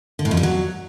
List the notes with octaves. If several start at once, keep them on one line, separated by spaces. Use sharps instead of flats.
D3
A2
F2
G3
F#3